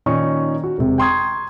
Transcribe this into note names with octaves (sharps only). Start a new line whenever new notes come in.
A#2 D#3 C#4 D#4 C#6
F#4
E1 C3
G5 A#5 C6 C#6 D#6 G#6